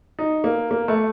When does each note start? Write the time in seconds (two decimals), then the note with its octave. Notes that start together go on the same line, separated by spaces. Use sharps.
0.19 D#4
0.44 A#3
0.71 A#3
0.88 A3